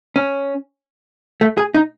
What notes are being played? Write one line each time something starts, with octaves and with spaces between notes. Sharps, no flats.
C#4
A3
G#4
D#4